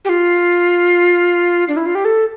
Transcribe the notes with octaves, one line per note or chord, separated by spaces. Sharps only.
G4
F4
D4
E4
F4
G4
A4